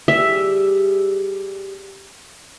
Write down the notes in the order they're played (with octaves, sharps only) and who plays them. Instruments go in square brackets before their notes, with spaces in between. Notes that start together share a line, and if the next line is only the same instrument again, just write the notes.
[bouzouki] G3 G4 G#4 [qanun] E5